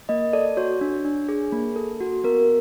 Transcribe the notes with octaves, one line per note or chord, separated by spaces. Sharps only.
A#3 D#5
A4 D5
F#4 C#5
D4
D4
G#4
A#3
A4
F#4
B3 A#4